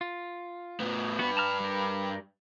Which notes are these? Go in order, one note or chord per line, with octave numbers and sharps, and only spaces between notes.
F4
A2 B3
G2 B3 F#4 B4
A5 A#5 F6
G3 A#4